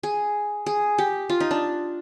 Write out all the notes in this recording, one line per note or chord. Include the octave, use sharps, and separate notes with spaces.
G#4
G#4
G4
F4
D#4
D4